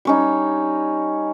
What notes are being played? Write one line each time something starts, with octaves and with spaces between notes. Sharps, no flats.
G3 C#4 D#4